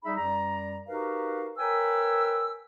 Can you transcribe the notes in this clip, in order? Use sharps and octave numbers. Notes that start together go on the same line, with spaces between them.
G3 D#4 G#4 E5 B5
F#2 G3 D5 A#5
D#4 F#4 G4 A#4 B4 F5
A#4 B4 C#5 G5 G#5 E6